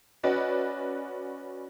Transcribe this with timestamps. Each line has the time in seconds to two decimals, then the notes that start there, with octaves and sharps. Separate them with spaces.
0.23 C#4 F#4 B4 D5 D#5